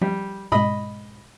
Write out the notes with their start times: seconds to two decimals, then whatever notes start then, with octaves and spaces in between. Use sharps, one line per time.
0.02 F3 G3
0.52 G#2 B2 G#3 D#5 B5